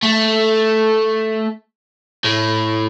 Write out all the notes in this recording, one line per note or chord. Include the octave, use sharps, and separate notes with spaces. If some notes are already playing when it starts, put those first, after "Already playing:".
A3
A2